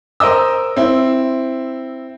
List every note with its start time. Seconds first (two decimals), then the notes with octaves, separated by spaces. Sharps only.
0.20 A#4 C5 D#5 E6
0.77 C4 E4